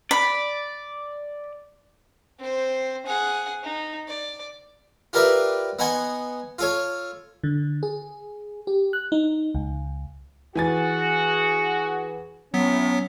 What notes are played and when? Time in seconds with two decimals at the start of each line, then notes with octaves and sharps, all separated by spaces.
0.11 D5 B5
2.39 C4 C5
3.07 G#4 F#5
3.63 D#4
4.08 D5
5.13 F4 G4 A#4 B4 D5 E5
5.79 B3 D#4 F#5 G#5 C6
6.59 F4 A4 C#5
7.44 D3
7.83 G#4
8.67 G4
8.93 F#6
9.12 D#4
9.55 C#2
10.56 E3 F#4 G#4 G#5 A6
12.54 A2 F#3 B3 C#4 B6